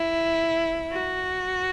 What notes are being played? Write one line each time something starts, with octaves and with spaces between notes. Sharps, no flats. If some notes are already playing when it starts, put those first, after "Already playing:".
Already playing: E4
F#4